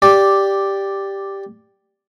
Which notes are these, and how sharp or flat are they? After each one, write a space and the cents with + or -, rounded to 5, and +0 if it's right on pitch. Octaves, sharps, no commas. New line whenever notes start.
G4 +0 D5 +0